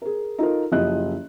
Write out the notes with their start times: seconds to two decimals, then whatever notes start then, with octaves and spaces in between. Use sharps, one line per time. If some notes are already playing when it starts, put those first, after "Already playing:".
0.02 G#4 A#4
0.38 D#4 F4 A4 A#4
0.72 F#1 F3 E4 G4 D#5 F#6